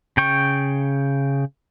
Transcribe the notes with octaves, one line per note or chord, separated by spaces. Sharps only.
C#3 G5 C#6